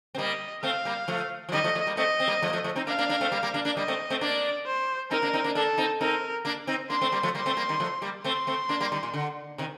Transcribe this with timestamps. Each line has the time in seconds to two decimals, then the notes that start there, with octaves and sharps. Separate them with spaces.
0.15 C4
0.18 G3 A#3 D#5
0.63 A3 C4 F5
0.85 G3 A#3
1.08 F3 A3
1.49 F3
1.53 D#3 G3 D#5
1.64 F3 A3
1.75 F3 A3
1.87 G3 A#3
1.97 A3 C4 D#5
2.20 C4
2.27 G3 A#3
2.42 F3 A3
2.49 A#3
2.53 F3 A3
2.64 F3 A3
2.76 C4 D#4
2.87 A#3 D4 F5
2.98 A#3 D4
3.09 A#3 D4
3.21 A3 C4
3.32 G3 A#3
3.43 G3 A#3
3.54 A#3 D4
3.65 A#3 D4
3.77 G3 A#3 D#5
3.88 A3 C4
4.10 A3 C4
4.21 A#3 D4 D5
4.66 C5
5.11 C4 D#4 A#4
5.22 A#3 D4
5.33 C4 D#4
5.44 A#3 D4
5.55 A#3 D4 A4
5.78 C4 D#4
6.01 C4 D#4 A#4
6.45 A#3 D4
6.67 C4 D#4
6.90 A#3 D4 C6
7.01 A3 C4
7.12 G3 A#3
7.23 F3 A3
7.35 G3 A#3 C6
7.46 A3 C4
7.57 G3 A#3
7.69 D#3 G3
7.80 F3 A3
8.02 G3 A#3
8.24 A3 C4 C6
8.47 A3 C4
8.69 A#3 D4
8.80 G3 A#3
8.92 D#3 G3
9.03 A#2
9.14 D3
9.58 C3 D#3